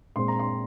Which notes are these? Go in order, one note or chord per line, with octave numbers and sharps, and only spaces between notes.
A#2 G#3 C4 C6
A#5
C6